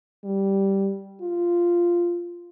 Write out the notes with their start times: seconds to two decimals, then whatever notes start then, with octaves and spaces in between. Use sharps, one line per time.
0.24 G3
1.22 F4